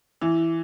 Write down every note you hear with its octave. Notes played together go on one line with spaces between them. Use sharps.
E3